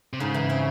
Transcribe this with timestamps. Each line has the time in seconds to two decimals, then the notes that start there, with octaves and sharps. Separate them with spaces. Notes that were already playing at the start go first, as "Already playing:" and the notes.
0.13 C3
0.19 G#2 C#3
0.34 E3
0.49 C4